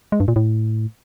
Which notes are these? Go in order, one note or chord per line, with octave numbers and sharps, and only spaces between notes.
G#3
G2
A#2
A2